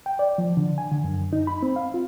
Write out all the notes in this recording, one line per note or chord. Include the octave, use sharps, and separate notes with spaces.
G5
D5
F3
D3
G#5
D3
F#2
D#4
B5
C4
F5
F4